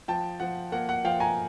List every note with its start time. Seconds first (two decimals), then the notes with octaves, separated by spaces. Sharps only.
0.08 F3 G5 A5
0.40 F3 F#5
0.72 A#3 F#5
0.89 F#5
1.04 F3 F5 G5
1.20 G#5 A#5